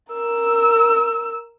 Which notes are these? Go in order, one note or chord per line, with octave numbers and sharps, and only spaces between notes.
A#4 E6